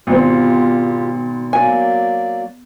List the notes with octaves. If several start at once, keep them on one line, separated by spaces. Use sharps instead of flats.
G#1 B2 C4 F4 G4
F#3 A#3 D5 G#5